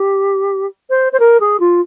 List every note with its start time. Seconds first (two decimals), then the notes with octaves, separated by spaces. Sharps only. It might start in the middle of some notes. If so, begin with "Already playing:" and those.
Already playing: G4
0.89 C5
1.12 C5
1.19 A#4
1.40 G#4
1.59 F4